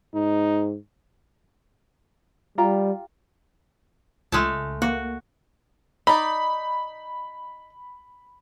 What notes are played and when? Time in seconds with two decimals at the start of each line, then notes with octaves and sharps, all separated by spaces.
0.14 G#2 D#4
2.58 G3 F4 G4 A#5
4.32 C#2 G#3 A3 A5
4.82 A#3 F#4
6.07 D#4 D5 B5